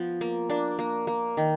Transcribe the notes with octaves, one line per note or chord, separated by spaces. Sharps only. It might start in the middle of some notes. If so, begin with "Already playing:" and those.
Already playing: F3 B3
A#3
A#3 D4
A#3
A#3
D#3